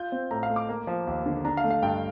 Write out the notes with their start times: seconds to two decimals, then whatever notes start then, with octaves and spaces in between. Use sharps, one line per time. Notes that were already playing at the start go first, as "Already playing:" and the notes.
Already playing: F4 G6
0.12 C4
0.31 A2 A#5
0.43 F5
0.50 A3
0.56 D6
0.69 A#3
0.87 F3
1.07 D#2
1.26 D3
1.45 D4 A#5
1.57 F5
1.64 A3
1.71 F5
1.83 G2 G5